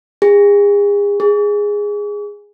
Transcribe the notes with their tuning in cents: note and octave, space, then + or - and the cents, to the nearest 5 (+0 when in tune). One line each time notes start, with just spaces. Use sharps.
G#4 -35
G#4 -10